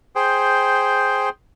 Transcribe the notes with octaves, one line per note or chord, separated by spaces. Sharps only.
G#4 C5 G5